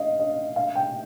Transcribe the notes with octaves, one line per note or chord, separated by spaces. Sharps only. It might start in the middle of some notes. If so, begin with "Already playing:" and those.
Already playing: D#5 F5
D#5
F5
G5